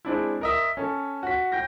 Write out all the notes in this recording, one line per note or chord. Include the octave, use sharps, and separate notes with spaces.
G#3 C4 D4 E4
A#4 D#5 E5
C#4 A4
F#4 B6
G5 G6 A#6